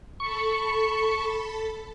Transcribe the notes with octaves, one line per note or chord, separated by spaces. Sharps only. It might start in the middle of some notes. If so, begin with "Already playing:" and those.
A4 A5 B5 C#6